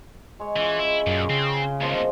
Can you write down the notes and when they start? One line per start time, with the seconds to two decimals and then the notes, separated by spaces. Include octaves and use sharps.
0.40 G#3 C#5
0.56 E3 C#4 F4
0.79 G#3 E4
1.07 F#2 A#2 D4
1.30 C#3 C4
1.81 D#2 B2 F3 G#3 A#3